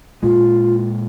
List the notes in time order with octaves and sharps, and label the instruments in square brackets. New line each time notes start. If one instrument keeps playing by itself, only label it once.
[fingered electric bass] A#2 G#3 [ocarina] F4